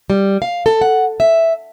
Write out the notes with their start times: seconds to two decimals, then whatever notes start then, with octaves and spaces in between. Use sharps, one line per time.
0.10 G3
0.42 F5
0.66 A4
0.81 F#5
1.20 E5